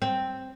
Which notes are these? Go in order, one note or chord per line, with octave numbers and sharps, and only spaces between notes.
C4